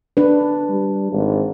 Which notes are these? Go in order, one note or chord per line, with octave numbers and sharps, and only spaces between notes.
D4 B4
G3
G#1